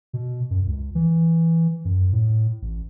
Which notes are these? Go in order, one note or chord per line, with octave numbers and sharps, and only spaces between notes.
B2
F#2
C#2
E3
F#2
A2
A1